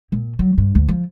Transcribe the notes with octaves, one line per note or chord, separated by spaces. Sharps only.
A#2
F#3
G2
D2
F3